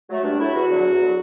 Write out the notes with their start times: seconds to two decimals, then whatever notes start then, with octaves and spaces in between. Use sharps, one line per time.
0.10 F#3 A3
0.24 G2 D4
0.39 F#3 A3 E4
0.55 E2 F#4
0.70 D3 F#3
0.85 E2
1.00 D3 F#3